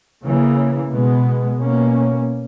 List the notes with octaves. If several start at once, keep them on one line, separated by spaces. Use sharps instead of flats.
C#3 E3 A#3
B2 G#3 B3
B2 A#3 C#4